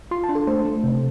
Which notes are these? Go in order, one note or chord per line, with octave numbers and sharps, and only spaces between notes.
F4 C6
A5
D4
A4
A3 C5
A3
C3